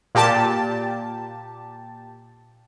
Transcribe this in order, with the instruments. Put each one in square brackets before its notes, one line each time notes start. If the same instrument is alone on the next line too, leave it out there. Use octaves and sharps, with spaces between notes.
[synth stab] A#2 G4 A5